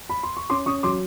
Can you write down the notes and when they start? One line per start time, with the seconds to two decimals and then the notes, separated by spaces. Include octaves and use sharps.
0.09 B5
0.23 C6
0.37 C#6
0.50 C#4 C6 D6
0.66 C#4 C#6 D#6
0.83 F#3 C6 D6